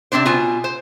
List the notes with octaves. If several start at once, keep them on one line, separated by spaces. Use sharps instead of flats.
C3 A3 C4 D4 C5
B2 F4 G#5
C5